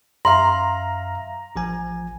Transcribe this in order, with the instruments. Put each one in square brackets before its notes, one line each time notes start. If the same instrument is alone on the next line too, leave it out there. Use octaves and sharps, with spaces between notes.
[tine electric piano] F#2 E5 F5 [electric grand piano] A#5 [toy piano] C6
[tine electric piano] A1 F3 G#5